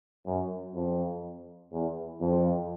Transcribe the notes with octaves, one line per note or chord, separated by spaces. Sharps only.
F#2
F2
E2
F2